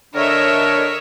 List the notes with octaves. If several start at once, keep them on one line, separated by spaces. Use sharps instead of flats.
D3 D4 A#4 C#5 D#5 E5